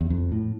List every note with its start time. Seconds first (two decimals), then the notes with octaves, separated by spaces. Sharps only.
0.01 E2
0.10 F2
0.32 A2